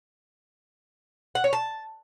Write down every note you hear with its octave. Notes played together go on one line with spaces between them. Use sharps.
F#5
C#5
A5